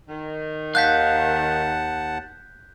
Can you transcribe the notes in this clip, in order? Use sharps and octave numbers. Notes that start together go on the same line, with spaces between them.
D#3
D#2 F5 F#5 A5 F#6 G6 B6